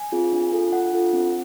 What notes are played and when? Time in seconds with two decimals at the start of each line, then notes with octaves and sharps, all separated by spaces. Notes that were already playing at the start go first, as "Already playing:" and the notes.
Already playing: G#5
0.12 C4 F4 G#4
0.33 D4
0.52 F4 A4
0.72 D4 F#5
0.93 F4 A4
1.13 C4